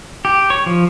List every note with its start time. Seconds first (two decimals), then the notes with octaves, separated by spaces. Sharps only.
0.25 G4
0.50 C#5
0.66 F3